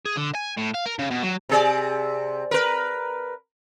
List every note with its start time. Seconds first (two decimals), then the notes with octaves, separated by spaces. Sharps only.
0.05 G#4
0.17 D3
0.35 G#5
0.58 A2
0.75 F5
0.86 A#4
0.99 C#3
1.11 B2
1.23 F#3
1.49 C3 G#4 D5
2.51 A#4 B4